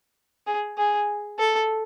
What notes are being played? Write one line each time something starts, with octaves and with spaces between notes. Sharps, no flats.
G#4
G#4
A4